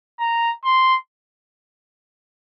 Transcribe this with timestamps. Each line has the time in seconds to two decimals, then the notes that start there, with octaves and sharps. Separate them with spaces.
0.20 A#5
0.65 C6